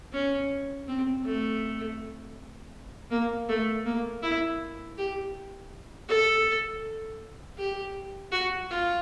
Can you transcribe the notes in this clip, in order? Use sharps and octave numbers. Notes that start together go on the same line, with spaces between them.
C#4
C4
A3
A#3
A3
A#3
E4
G4
A4
G4
F#4
F4